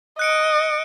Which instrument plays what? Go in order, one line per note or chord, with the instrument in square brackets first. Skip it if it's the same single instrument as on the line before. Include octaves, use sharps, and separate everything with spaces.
[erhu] D#5 [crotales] F#6 C#7 D7